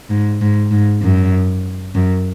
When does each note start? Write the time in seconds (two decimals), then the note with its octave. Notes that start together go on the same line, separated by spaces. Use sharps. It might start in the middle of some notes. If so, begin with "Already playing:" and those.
0.10 G#2
0.41 G#2
0.71 G#2
1.02 F#2
1.95 F#2